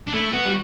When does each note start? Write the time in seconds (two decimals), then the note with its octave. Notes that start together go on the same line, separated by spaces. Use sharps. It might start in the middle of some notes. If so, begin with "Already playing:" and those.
0.08 D4
0.14 A3 E4
0.33 B3 F#4
0.45 G3